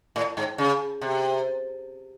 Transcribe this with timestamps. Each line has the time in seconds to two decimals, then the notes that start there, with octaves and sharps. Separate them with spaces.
0.16 A2
0.37 G#2
0.58 C#3
1.01 C3